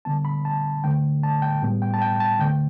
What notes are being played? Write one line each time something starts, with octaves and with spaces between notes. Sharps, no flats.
D3 G3 B3 A5
B5
A5
D3 A3 G5
A5
G5
A2 G3 B3
G5
A5
G5
A5
D3 A3 G5